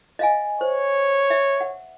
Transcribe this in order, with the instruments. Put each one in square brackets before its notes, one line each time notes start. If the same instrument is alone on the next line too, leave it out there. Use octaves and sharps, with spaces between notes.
[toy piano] D#5 F5 G#5
[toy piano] C5 [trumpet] C#5
[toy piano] E5
F#5